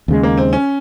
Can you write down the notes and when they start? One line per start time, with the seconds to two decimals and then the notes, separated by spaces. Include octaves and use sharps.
0.08 D#2 C#3 G#3
0.23 A#3
0.38 C4
0.53 C#4